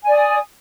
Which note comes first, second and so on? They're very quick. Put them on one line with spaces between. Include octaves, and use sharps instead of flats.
G#5 D5 D#6